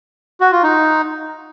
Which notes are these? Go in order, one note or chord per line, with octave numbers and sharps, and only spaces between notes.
F#4
F4
D#4